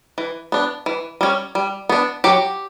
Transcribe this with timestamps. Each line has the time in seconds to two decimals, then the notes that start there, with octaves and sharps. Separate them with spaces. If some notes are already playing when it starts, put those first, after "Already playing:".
0.18 E3
0.52 B3 D4
0.86 E3
1.21 G3 C#4
1.55 G3
1.89 B3 D4
2.24 F#3 G4